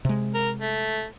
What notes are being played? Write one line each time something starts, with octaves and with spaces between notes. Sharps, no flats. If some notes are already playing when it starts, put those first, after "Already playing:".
C3 G#3
A#4
A3